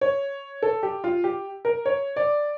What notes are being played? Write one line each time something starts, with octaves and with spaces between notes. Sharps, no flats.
C#5
A4
G4
F4
G4
A#4
C#5
D5